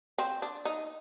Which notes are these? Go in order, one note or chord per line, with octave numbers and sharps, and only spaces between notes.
C4
D4
D#4